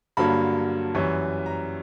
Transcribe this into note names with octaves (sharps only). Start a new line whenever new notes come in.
G2 D3 F#3 A#3 B5
F#2 E3 G3 C#6
A#5